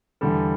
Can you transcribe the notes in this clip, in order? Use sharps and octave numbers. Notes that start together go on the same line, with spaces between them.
E2 D3 G3 A4